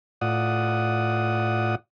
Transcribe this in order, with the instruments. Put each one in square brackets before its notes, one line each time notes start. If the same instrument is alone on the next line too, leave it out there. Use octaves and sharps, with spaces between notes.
[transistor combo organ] A2 F4 D5 F#5 D#6